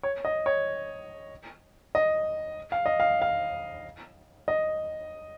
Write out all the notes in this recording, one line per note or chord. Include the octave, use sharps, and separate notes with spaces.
C#5
D#5
C#5
D#5
F5
D#5
F5
F5
D#5